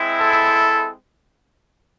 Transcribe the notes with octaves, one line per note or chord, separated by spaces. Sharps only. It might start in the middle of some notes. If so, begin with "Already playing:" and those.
Already playing: G#3 C4 E4
A4